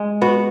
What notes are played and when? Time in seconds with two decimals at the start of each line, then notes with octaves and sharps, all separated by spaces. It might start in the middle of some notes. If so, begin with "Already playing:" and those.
Already playing: G#3
0.21 B3 F#4